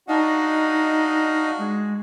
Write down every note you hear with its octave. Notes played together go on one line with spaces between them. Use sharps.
D4 D#4 F#4 D#5 F5
G#3